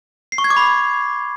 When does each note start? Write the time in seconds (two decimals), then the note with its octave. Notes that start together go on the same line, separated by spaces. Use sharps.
0.32 C7
0.38 C#6
0.44 G#6
0.50 D6
0.57 B5